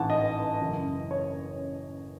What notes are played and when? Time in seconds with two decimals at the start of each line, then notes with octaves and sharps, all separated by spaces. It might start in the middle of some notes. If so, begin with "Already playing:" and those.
Already playing: A1 G#2 E3 F#5 A5
0.10 D#5
0.60 F#1 F#2 E3
1.11 C#5